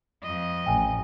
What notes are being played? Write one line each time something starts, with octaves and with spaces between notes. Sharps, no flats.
F2 D#5
A1 G5 G#5